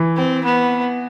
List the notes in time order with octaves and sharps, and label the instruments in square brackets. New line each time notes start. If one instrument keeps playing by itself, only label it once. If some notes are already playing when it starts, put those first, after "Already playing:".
Already playing: [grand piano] E3
[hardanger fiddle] C4
B3